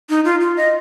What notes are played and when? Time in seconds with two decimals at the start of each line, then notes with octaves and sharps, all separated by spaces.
0.10 D#4
0.25 F4
0.40 F4
0.57 D#5